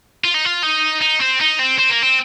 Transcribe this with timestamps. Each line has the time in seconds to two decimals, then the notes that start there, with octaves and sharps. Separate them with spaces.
0.24 F4
0.34 D#4
0.45 F4
0.63 D#4
1.01 D#4
1.20 C4
1.40 D#4
1.59 C4
1.78 C4
1.90 A#3
2.03 C4